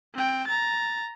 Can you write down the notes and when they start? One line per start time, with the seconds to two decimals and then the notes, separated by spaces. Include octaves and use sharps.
0.14 C4 G5
0.47 A#5 A6